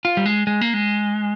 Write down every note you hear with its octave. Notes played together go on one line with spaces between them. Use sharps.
F4
G3
G#3
G#3
A#3
G#3